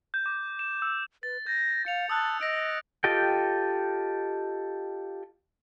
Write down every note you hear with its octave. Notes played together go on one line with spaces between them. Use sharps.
G6
D6
E7
E6
B4 A6
G6 A#6
F5 C#7 F7
A5 D#6 E6 F#6
D#5 E6 A#6 D7
F4 G4 A4 D#5 G5